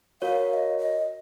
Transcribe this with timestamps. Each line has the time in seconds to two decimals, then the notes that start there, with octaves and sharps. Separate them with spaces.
0.22 F#4 A#4 C#5 F5
0.50 F5
0.54 D#5
0.78 D#5